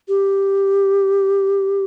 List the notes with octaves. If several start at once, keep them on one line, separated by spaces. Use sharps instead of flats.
G4